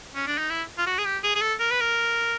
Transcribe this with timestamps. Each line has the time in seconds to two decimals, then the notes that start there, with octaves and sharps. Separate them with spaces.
0.15 C#4
0.27 D4
0.38 D#4
0.50 E4
0.78 F4
0.87 F#4
0.98 G#4
1.05 G4
1.24 G#4
1.35 G#4
1.41 A4
1.60 A#4
1.71 B4
1.81 A#4